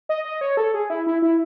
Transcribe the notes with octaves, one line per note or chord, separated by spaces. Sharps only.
D#5
D#5
C#5
A4
G#4
E4
E4
E4